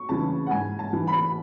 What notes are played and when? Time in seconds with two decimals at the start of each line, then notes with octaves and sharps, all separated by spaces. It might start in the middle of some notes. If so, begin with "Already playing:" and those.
Already playing: C#6
0.09 C#3 E3 A5
0.47 F#5
0.51 G#2 G#5
0.79 A5
0.93 E3
1.07 B5